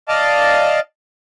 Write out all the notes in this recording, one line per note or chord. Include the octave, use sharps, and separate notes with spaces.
D5 D#5 F5 A5